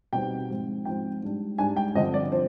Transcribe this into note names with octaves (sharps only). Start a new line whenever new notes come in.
B2 G3 C4 D#4 G5
G#2 F3 C4 F4
G#2 F3 C4 F4 G5
G#2 G3 D4
G#2 G3 D4 G#5
G5
G2 D3 F3 C4 D#5
D5
F3 C4 C5